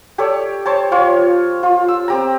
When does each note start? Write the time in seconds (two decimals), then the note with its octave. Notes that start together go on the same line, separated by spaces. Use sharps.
0.18 G4 A4 C#5 D5
0.66 C5 C#5 A5
0.91 F3 F4 C#5
1.63 F4
1.88 E6
2.08 C4 G4 A#5